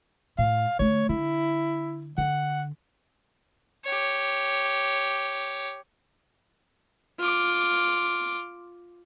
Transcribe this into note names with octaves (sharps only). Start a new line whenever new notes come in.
A2 F5
D3 A3 C#5
D3 E4
D3 F#5
G4 C#5
F4 D6